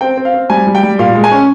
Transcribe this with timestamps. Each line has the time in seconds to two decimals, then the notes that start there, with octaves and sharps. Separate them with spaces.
0.01 C4 G5
0.17 C4
0.25 F5
0.34 C4
0.50 G3 G#5
0.67 G3
0.75 G5
0.83 G3
0.99 A#2 F5
1.15 G#3
1.24 G#5
1.31 C#4